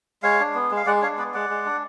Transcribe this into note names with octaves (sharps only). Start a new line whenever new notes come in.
G#3 C#5 F5
D4
B3
G#3
F5
G#3 D5 F#5
D4 C#5 F5
B3 B4 D5
G#3 D5 F#5
G#3
D4